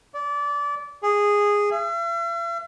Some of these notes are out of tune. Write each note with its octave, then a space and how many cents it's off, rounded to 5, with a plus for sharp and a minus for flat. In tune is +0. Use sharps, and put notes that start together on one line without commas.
D5 -25
G#4 -10
E5 +45